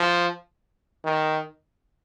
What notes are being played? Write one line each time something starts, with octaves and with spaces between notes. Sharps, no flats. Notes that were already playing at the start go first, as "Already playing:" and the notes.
Already playing: F3
D#3